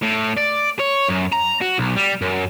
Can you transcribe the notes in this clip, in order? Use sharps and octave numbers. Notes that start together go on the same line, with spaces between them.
A2
D5
C#5
F#2
A#5
F#4
B1
G3
F#2